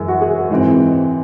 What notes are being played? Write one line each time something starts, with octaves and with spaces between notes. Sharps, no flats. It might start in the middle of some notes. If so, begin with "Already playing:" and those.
Already playing: F#2 E3 G#3
F#4
G#4
G#2 E3 C4